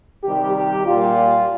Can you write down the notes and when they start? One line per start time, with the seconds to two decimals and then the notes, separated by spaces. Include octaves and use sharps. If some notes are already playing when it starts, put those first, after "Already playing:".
0.24 C3 D#3 G3 G4
0.55 G4
0.86 A#2 G3 F4